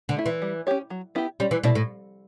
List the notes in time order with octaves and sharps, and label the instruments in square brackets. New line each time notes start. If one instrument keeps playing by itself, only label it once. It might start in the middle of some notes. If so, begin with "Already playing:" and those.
[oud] D3
[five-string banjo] A3 E4
[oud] E3
[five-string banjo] G3
C#4 G4 C#5
F#3
B3 E4 G4
[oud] G3 [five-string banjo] C#4
[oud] E3
[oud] B2 [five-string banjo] E4 A4 D5
[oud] A2